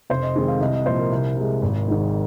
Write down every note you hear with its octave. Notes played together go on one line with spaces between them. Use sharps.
F1 C5
D#5
F2 D#3 G#3 C4
F5
C2 D#5
D#5
A#2 F3 C5
A#4
C2
C3 G#3
G#1
G#2 D#3